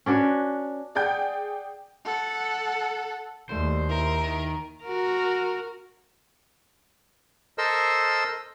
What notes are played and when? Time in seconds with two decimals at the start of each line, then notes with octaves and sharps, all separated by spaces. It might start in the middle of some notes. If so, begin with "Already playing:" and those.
0.06 C#4 D4 F#4 B4
0.95 G#4 D5 F#5 G5 G6
2.05 A4 F#5
3.49 D#2 F#3 G3 A3 C5
3.89 E4 A#4
4.22 D#3
4.83 F#4 A#4
7.58 A4 A#4 C5 D#5 E6